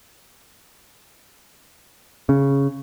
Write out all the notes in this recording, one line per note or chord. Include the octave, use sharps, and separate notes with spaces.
C#3